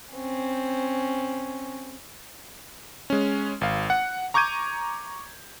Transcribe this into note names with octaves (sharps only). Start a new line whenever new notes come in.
C4 C#4
G#3 C#4
G#1 F5
F#5
A#5 C#6 D6 G6 G#6 D#7